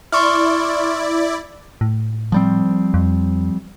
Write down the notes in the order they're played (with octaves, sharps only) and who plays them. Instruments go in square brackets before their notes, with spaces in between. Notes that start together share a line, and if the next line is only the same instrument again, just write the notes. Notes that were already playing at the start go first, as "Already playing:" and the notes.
[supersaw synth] E4 D5 [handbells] C6 C#6 F6
[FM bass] A2
[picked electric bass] F3 G3 C4
[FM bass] F2